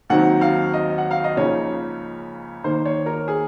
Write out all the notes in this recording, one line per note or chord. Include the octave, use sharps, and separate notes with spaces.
D#2 D#3 F#3 C4 D#4 F#5
F5
D#5
F#5
F5
D#5
C#2 C#3 F3 A#3 D#4 C#5
D#2 D#3 A#3 D#4 C5
C#5
A#4
G#4